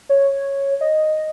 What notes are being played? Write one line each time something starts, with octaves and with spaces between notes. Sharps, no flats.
C#5
D#5